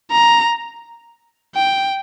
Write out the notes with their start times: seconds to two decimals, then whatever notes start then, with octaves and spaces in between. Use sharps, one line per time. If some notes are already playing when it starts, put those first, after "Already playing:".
0.11 A#5
1.55 G5